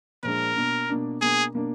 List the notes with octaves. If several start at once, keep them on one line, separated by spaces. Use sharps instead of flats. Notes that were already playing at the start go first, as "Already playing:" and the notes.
A#2 F3 G#3 D4 A#4
B2 A#3 D4
B2 A#3 D4
B2 A#3 D4 G#4
B2 A#3 D4